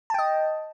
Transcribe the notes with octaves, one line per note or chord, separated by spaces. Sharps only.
D#5 G5 A5